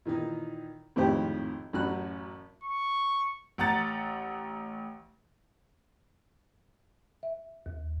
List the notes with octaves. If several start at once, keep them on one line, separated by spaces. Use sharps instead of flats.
A#2 D#3 E3 D#4
G#1 F2 A2 D#3 G4 C5
A1 F#2 F#3 F#4 B5 F#6
C#6
A1 F#5 A#5 A6
E5
D#2